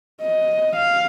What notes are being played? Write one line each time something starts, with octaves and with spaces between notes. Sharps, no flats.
D#5
F5